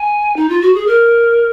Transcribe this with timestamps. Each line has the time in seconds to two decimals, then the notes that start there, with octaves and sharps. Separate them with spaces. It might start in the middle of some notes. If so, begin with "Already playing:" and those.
Already playing: G#5
0.36 D#4
0.49 F4
0.62 F#4
0.75 G#4
0.87 A#4